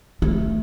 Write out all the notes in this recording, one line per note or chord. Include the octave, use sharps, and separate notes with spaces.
A3